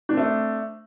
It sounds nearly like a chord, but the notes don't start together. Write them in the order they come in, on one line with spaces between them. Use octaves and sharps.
D4 C4 A3